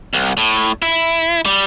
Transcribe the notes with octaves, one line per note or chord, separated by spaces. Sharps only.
C2
A2
E4
G3